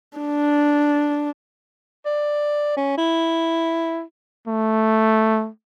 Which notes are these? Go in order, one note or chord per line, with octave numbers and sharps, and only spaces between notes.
D4
D5
C#4
E4
A3